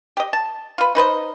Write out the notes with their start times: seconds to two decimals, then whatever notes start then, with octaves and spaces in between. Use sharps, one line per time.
0.17 G4 D#5
0.33 A5
0.78 F4 B4
0.95 D#4 B4 C5 D#5